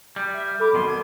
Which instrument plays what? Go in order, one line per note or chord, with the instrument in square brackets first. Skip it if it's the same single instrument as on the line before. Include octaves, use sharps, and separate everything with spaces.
[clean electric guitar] G3
[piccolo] E5
F6
[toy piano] A4 B5 [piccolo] D6
[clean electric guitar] B1 B2 D#3 [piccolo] C6
[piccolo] G#6